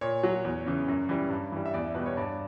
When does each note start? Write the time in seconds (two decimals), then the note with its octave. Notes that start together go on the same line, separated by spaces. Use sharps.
0.01 A#2 C#5
0.23 F#3
0.44 E2
0.66 C#3 E3
0.88 F#2
1.09 E3 G3
1.30 G2
1.52 E3 G3
1.65 E5
1.74 E2 D5
1.84 E5
1.95 B2 G3 B4
2.06 C#5
2.17 G2 D5